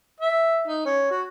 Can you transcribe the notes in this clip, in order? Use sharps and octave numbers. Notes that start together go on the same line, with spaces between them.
E5
D#4
C#4
F#4